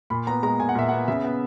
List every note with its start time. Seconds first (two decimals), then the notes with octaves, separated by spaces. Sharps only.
0.10 A#2 B5
0.27 B3 A#5
0.43 G#3 A#5
0.60 A#2 G#5
0.69 F#5
0.75 A#2 E5
0.89 F#5
0.92 B3
1.08 C#3 E5
1.24 B3